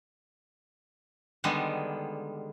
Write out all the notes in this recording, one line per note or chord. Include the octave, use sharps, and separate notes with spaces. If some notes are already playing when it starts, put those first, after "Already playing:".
D3 D#3 G3 G#3 B3